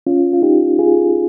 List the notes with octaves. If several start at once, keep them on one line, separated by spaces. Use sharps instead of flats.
C#4 F4
F4
D#4 G4
F4 G#4